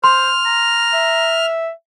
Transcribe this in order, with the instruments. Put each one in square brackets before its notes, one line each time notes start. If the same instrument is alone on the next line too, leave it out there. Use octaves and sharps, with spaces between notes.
[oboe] C5 [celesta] C6 [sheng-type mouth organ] F6
[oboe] A#5
[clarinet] E5